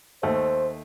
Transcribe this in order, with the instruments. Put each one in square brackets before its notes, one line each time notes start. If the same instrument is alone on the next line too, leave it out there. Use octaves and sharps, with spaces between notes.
[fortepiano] D#2 A3 [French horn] C5